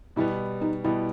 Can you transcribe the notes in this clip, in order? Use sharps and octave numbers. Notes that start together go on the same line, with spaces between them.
B2 G3 B3 E4
D#4
B2 G3 B3 E4